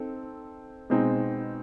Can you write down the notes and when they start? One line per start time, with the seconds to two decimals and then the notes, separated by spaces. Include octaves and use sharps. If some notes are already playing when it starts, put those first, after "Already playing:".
Already playing: C4 D#4 A4
0.90 B2 G#3 C4 D#4